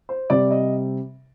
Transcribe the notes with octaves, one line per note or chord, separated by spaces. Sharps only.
C5
C3 G3 C4 D5
D#5